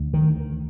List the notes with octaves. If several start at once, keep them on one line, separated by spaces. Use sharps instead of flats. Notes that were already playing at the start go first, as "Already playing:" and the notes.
Already playing: D2
D#3